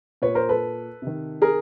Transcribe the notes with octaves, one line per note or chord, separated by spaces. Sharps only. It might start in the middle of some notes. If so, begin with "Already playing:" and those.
A#2 B4 C#5
A#4 C5
A4 B4
C3 D#3
G#4 A#4